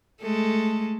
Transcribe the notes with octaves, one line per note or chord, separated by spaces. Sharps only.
G#3 A3 A4